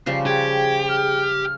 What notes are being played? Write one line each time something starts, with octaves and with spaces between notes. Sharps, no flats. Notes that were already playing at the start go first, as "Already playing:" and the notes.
C#3 F3 G3 C7
G4 G#4 G5 G#6
F6